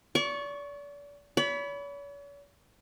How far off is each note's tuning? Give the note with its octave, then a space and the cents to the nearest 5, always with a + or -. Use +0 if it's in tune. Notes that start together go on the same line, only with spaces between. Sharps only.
D5 -35 C#6 +0
C#5 +45 B5 +0